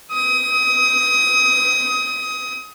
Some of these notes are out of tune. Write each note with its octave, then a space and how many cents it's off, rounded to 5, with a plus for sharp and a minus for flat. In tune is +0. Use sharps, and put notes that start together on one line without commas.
D#6 +25